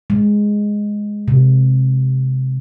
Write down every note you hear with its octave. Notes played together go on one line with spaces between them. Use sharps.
G#3
C3